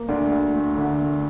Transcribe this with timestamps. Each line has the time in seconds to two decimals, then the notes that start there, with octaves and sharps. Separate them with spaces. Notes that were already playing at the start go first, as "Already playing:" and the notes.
Already playing: A#3
0.08 D2 D4
0.32 D2
0.54 A3
0.78 D3
1.00 A3